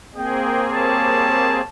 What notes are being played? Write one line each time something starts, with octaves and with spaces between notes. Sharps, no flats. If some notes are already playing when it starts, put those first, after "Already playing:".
A#3 C4 G#4 D#5 G5
G3 C#5 A5